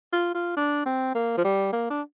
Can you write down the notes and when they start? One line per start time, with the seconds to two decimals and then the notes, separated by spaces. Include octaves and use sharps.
0.13 F4
0.35 F4
0.57 D4
0.86 C4
1.15 A#3
1.37 F3
1.44 G3
1.72 A#3
1.90 D4